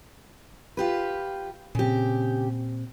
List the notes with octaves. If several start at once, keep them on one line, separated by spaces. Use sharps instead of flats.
F4 G4 B4
A#2 C#3 C4 G4